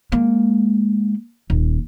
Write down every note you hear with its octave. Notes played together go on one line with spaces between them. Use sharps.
G#3 A#3
D#1